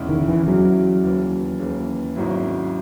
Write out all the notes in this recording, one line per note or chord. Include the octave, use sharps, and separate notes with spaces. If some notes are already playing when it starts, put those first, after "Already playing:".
Already playing: E2 C#3 G#3 C#4 E4
D#3
D#3
E3
E2 C#3 F#3 G#3 C#4 E4
D#2 C#3 E3
D#2 C#3 E3
G#1 G#2 F#3 C#4 E4